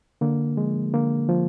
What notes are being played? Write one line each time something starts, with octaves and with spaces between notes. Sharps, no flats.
D3 A#3
F3 G#3
D3 A#3
F3